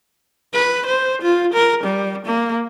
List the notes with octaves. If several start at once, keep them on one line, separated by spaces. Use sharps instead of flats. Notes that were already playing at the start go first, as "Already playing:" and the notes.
B4
C5
F4
A#4
G3
A#3